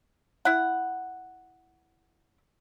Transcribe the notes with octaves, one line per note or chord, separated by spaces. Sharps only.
E4 F#5